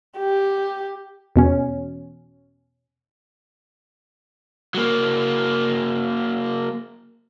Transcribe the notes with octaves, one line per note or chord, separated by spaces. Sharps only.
G4
E2 B2 C#4
F#3 A#3